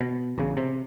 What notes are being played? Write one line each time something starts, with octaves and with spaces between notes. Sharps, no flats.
B2
A1 C#3
C3